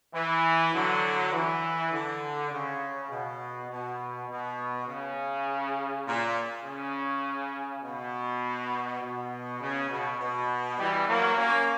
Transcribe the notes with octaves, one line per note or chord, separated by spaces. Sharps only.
E3
D3 F#3
E3
D3
C#3
B2
B2
B2
C#3
A#2
C#3
B2
B2
C#3
B2
B2
E3 G3
F#3 A#3
A#3 C#4